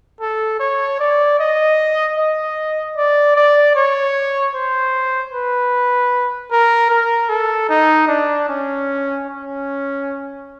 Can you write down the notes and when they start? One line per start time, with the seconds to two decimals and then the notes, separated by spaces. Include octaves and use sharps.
0.20 A4
0.59 C#5
0.99 D5
1.39 D#5
2.17 D#5
2.96 D5
3.36 D5
3.75 C#5
4.54 C5
5.33 B4
6.51 A#4
6.90 A#4
7.29 A4
7.69 D#4
8.08 D4
8.48 C#4
9.27 C#4